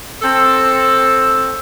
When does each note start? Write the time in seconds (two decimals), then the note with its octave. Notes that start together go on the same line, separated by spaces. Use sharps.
0.22 C4 A4